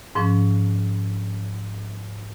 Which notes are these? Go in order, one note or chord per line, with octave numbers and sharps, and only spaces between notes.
G#2 F3 C#4